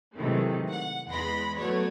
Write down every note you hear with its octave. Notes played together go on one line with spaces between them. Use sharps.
C3 D#3 E3 F#3 G#3 A3
F#5
E2 G#3 B3 B5 C6 A#6
F#3 A3 B3 F#4 C#5 D5